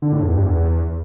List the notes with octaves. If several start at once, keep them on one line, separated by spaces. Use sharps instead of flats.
D3
A2
E2
G2
E2